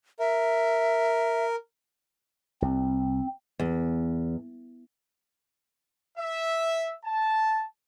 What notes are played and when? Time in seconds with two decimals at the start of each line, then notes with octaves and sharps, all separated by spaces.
0.19 A#4 E5
2.62 C2 C4
3.60 E2
6.18 E5
7.05 A5